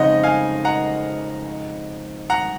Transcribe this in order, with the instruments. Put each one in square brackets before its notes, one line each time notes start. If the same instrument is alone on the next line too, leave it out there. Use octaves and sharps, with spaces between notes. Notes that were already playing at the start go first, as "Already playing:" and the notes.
Already playing: [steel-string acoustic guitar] F2 C#3 F3 G#3 D#4 [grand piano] D#5 F#5
[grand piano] F5 G#5
F#5 A#5
F#5 A#5